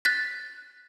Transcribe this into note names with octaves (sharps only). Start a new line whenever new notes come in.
F#6 A6 B6